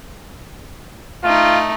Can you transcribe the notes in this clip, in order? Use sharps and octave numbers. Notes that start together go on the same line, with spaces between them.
A3 D#4 F4